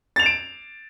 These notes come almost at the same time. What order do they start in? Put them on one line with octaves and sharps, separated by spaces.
A6 F7 E7 D7